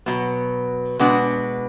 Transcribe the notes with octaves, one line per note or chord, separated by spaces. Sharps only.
B2 F#3 B3
B2 G#3 B3 D4 F#4